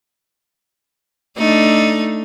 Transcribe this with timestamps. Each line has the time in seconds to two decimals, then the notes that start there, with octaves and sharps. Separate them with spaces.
1.38 A3 D4 D#4